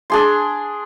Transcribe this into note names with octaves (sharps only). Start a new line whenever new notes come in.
D4 G#4 C6